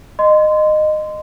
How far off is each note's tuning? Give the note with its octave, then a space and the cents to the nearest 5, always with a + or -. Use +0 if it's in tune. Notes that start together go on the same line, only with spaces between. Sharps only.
D#5 -20 C6 -20